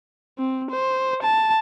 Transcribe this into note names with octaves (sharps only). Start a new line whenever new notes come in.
C4
C5
A5